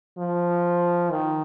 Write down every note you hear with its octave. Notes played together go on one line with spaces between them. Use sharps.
F3
D#3